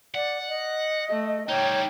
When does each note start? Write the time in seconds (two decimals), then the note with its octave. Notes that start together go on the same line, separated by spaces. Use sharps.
0.15 D5 F#5
0.48 D#5
1.10 A3
1.49 G3 D#4 C#5 G5